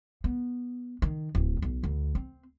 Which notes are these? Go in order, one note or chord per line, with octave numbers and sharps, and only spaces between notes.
B3
D#3
D1
B1
D2
C4